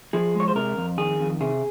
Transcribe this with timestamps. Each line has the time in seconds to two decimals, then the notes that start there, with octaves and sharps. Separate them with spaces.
0.13 F3 G#4
0.35 G#3 C#5
0.48 C5
0.55 C3 A#4
0.77 F2
0.98 D#3 G#4
1.20 F2
1.41 C3 G#4